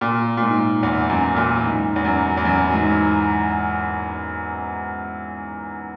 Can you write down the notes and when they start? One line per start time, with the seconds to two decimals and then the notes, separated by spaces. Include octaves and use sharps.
0.01 A#2
0.37 A#2
0.42 G#2
0.83 E2
1.10 F#2
1.36 A#2
1.64 G#2
1.96 E2
2.05 F#2
2.37 E2
2.45 F#2
2.72 G#2